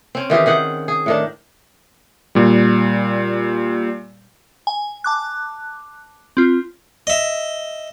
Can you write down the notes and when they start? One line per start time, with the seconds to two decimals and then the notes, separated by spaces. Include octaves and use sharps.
0.15 C4 C#4
0.30 D#3 E3 G4 G#4
0.46 D#3 G#4 F#5
0.88 G#4
1.06 A2 D#3 D4
2.35 A#2 G3
4.67 G#5
5.04 A5 D6 F#6
6.37 C4 F4
7.07 D#5 E5